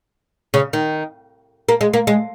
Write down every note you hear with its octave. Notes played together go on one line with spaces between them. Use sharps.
C#3
D#3
A#3
G#3
A#3
G#3